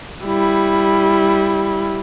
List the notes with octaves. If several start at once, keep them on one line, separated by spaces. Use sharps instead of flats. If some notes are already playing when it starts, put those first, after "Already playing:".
G3 E4